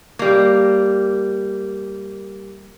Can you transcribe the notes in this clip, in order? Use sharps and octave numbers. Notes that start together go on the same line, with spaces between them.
G3 A#3